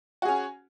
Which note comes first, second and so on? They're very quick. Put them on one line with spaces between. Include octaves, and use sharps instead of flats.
F#4 G#4 C#4